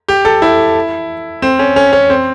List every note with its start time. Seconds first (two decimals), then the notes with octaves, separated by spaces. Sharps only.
0.08 G4
0.25 A4
0.42 E4
1.42 C4
1.59 C#4
1.76 C#4
1.93 C#4
2.10 C4